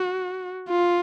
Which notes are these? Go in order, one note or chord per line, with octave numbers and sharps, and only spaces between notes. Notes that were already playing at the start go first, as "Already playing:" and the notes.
Already playing: F#4
F4